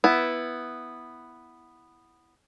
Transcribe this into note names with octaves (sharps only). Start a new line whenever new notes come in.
B3 E4